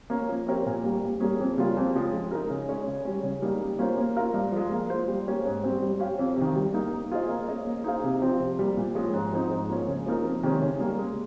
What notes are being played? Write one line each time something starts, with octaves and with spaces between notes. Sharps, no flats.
A#3 C#4
F3
C4 G4 A#4 C#5
A#2
G3 A#3
G2
G3 A#3 C#4 G#4
F2
C#3 G3 A#3 F4
F2
C#3 F3 G#3
G#3
D#4 A#4
C#3
G#3 C#4 G#4 C#5
C#3
G3 C#4
C#3
G3 A#3 D#4
G3
A#3 C#4 F4 C5
A#3
F4 A#4 F5
G2
F3 G#3
A#3
F4 C5
G3
A#3 C#4 G4
G#2
G3 C4
G3
C#4 G4 C5 F5
F2
C3 D#3
G3
A#3 D#4
A#3
F4 G#4 C5 D#5
A#3
C#4 G#4 D#5
A#3
D#4 G#4 C5 F5
C3
F3 C4 G4
C3
G3 A#3
A#2
F3 G#3 C#4
G#2
F3 C4 D#4
G#2
F3 A#3 C#4
C#3
F3 A#3 D#4 A#4
F2
C3 D#3 G#3 C#4
C#3
G3 A#3
G#3